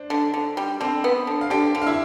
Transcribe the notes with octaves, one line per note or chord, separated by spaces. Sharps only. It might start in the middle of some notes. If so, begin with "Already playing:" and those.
Already playing: D4 C5
D3
D3
G3
D3 C4 C5
B3
D3
F5
D3 G4 G5
D3
F5
E4 E5